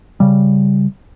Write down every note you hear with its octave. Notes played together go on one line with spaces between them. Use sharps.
C#3 G3